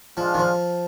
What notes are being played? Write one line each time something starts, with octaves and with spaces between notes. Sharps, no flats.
F3 G#3 D4 F4
D#3
F3